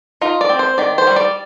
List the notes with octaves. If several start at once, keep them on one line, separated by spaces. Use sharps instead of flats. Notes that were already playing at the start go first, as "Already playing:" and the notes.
D#4 F4
D5
C4
C5
D#3 D5
C5
G3
D5